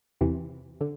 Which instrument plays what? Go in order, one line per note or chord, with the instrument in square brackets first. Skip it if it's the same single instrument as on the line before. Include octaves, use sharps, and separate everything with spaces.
[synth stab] E2 C3 E3
D3